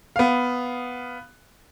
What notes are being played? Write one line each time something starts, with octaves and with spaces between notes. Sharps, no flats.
B3 F5